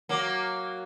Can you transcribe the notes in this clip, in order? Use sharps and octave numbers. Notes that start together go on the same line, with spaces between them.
F#3 A#3